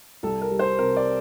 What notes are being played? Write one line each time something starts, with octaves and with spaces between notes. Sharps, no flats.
C2 A4
A#4
G3
C5
C3 A#4
D5